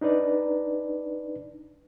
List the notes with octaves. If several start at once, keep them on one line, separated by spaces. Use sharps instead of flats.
D4 D#4 B4 D5